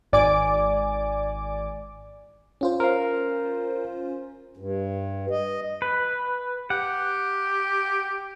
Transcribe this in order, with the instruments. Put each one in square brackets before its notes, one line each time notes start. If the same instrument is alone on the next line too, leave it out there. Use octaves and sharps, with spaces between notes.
[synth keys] G#1 D5 G#5 D6
[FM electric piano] C#4 F4 C5
[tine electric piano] A#4 F5
[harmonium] G2
D#5
[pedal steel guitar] B4
[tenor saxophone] G4 [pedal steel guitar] F#5